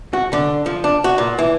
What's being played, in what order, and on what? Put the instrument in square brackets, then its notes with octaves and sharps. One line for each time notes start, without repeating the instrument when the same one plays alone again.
[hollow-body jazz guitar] F#4
D3
F3
D4
F#4
A#2
E3